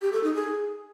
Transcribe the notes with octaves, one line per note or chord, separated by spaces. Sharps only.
G4
A4
D#4
G#4